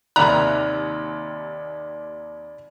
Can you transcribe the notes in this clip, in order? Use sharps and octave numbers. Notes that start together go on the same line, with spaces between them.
D#2 C3 D#3 D5 A#5 B5 F#6